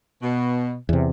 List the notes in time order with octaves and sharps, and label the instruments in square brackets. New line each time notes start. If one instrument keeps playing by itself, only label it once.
[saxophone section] B2
[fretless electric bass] E2 C3